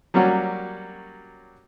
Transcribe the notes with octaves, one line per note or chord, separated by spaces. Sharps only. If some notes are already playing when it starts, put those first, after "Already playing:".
F#3 G3 A#3 C#4 F#4 G4